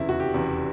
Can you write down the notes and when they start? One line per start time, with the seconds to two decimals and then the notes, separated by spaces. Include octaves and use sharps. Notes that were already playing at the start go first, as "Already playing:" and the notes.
Already playing: F1 E2 C#3 E4
0.09 F#4
0.20 G4
0.34 F1 E2 C#3